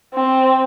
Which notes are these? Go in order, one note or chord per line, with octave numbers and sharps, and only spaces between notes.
C4